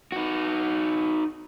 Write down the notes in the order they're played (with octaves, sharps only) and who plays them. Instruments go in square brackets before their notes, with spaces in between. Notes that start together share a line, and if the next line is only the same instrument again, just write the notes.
[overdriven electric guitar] D#4 F#4